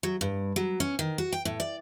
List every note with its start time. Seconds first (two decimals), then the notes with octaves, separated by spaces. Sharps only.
0.03 F#3
0.21 G2
0.56 F#3
0.80 C#4
0.99 D#3
1.18 F#4
1.32 G5
1.45 A2
1.60 D5